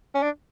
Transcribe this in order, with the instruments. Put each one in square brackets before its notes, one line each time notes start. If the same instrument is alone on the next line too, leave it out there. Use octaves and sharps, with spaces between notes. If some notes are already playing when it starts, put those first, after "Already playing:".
[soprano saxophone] C#4
D4